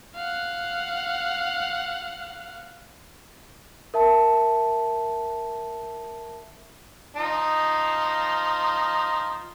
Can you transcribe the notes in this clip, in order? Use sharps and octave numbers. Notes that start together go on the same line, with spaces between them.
F5 F#5
A#4 E5 A5
F3 D#4 D#5